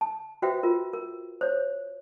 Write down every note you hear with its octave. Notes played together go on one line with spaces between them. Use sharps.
A5
F#4 B4 C5 E5 G5
F4 A#4
A#4
C5 C#5